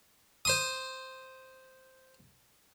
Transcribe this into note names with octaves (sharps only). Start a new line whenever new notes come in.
C5 C6 D#6